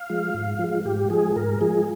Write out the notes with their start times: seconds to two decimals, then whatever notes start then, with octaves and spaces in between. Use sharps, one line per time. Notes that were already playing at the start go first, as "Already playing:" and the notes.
Already playing: F5
0.10 F3 G#3
0.34 G#2
0.59 F3 G#3
0.85 G#2 G4
1.10 F3 G#3 G#4
1.36 G#2 A#4
1.61 F3 G#3 G#4